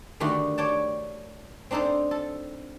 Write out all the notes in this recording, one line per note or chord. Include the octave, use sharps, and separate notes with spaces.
D3 D#3 A3 F#4 G4
C#5 D5 G5 A5
C4 D4 D#4 A4 C5
A4